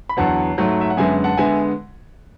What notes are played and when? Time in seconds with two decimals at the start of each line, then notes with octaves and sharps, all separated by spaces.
0.09 B5
0.17 E2 D3 F#3 B3 F#5 A5
0.58 G#2 F#3 A3
0.81 E5
0.90 F#5
0.97 F#2 D3 G#3 B3 E5 G#5
1.24 F#5 A5
1.37 D3 G#3 B3 E5 G#5